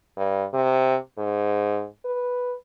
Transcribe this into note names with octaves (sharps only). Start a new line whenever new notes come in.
G2
C3
G#2
B4